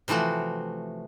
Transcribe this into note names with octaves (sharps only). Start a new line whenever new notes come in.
C3 E3 F3 A3 F#4